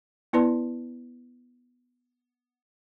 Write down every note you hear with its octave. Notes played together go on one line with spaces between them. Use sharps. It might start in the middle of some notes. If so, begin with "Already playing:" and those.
B3 E4 B4 D5 A5 C6